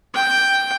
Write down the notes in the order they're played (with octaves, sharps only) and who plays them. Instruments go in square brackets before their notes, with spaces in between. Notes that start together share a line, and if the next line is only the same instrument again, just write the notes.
[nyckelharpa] G5